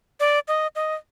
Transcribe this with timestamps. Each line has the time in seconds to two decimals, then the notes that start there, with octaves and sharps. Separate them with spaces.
0.20 D5
0.48 D#5
0.75 D#5